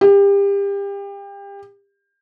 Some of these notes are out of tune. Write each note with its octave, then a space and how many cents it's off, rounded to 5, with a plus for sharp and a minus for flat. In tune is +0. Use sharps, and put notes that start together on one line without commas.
G4 +30